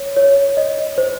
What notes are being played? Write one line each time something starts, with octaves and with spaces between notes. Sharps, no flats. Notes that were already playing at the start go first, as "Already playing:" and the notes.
Already playing: C#5
C#5
D#5
C5